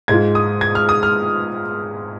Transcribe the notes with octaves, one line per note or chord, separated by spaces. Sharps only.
G#2 G#3 F4 G#6
D#6
G#6
F6
D#6
F6